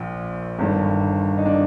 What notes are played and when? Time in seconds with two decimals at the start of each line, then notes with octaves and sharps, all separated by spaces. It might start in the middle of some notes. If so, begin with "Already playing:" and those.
Already playing: A#1 A#2
0.59 G1 G2 D#3
1.38 D#4
1.46 D4